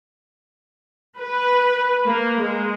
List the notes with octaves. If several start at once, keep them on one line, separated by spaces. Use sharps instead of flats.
B4
A#3
G#3